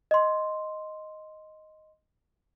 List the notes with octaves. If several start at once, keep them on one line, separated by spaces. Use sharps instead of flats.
D#5 C6